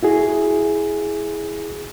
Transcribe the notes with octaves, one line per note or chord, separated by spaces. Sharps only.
E4 F#4 G#4